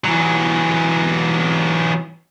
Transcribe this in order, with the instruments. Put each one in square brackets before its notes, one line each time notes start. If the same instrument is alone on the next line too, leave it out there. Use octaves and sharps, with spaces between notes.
[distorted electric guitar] E3 F#3